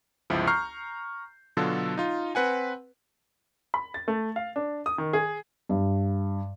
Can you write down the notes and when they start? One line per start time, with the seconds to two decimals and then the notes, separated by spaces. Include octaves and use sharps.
0.30 G1 C#2 F3 E4
0.47 A#5 C#6 F6 G6 C7
1.57 B2 D3 F#3 F4 A4
1.97 D#4 F4
2.35 C4 B4 F#5 G#5
3.74 B5
3.94 A6
4.08 A3
4.36 F5
4.56 D4
4.86 D#6
4.98 D#3
5.13 G#4
5.69 G2